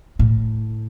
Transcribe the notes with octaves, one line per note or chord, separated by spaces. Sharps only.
A2